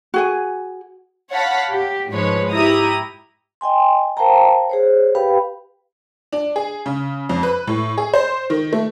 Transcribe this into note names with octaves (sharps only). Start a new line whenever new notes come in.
F#4 G#4 G#5
C#5 F5 F#5 A5 B5 B6
G4
G#2 F3 G#3 B4 C#5
E4 G4 A#5 D#6
D#5 G5 G#5 C6
A#4 C5 F5 G5 A5 A#5
G#4 C5 C#5
G4 B4 F5 G5 B5
D4
G#4
C#3
F2
B4
A2
G#4
C5
D#3
A3